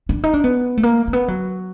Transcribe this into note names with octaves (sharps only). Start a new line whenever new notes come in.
D4
D#4
D4
B3
A3
A#3
A#3
B3
F#3